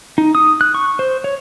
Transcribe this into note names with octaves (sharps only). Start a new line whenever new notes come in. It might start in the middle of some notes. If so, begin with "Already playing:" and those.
D#4
D#6
F#6
C#6
C5
C#5